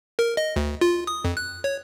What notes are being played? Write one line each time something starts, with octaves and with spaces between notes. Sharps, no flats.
A#4
D#5
D2
F4
D#6
F2
F#6
C#5